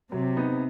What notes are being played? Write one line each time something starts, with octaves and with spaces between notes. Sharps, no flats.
C3 F#3
B3 D#4